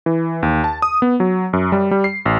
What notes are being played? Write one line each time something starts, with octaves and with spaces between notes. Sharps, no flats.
E3
D#2
A5
D#6
B3
F#3
F#2
G3
G3
C7
A1